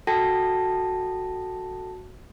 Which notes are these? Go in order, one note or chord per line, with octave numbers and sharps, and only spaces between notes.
F#4 A4 G5 A5 A#6